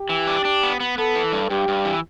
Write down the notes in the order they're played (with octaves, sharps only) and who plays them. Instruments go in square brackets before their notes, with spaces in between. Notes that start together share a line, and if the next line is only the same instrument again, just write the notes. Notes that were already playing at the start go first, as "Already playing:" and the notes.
Already playing: [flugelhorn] G4
[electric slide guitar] E3
D4
D4
B3
B3
[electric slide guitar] B3 [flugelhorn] A4
[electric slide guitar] E3
G2
[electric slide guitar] G2 [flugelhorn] G4
[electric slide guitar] G2
E3